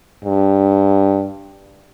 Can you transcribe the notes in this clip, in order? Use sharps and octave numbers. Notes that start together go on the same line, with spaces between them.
G2